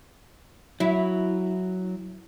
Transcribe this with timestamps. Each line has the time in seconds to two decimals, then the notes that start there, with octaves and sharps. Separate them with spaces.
0.80 F#3 E4